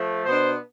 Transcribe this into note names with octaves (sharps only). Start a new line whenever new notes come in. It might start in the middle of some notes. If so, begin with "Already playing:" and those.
Already playing: F3 A3
B2 B3 D4 C5